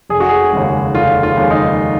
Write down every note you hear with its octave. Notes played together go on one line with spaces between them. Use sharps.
F1 G#4
F#4
G#4
D#2 C#3 G#3
F1 F4
F4
D#2 C#3 G#3
D#4